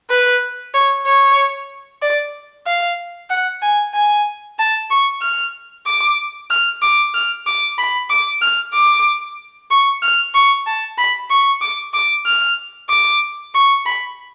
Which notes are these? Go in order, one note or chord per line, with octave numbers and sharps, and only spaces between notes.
B4
C#5
C#5
D5
F5
F#5
G#5
G#5
A5
C#6
F6
D6
F6
D6
F6
D6
B5
D6
F6
D6
C#6
F6
C#6
A5
B5
C#6
D6
D6
F6
D6
C#6
B5